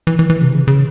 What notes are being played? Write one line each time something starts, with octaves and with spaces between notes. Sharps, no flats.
E3
E3
E3
C3
C#3
C#3